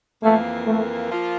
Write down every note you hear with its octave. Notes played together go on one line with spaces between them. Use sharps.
F2 E3 A3 A#3
A3
F3 A#3 F4